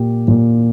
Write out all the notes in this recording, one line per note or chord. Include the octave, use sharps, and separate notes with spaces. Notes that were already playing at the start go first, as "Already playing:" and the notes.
Already playing: A#2 G4
A#2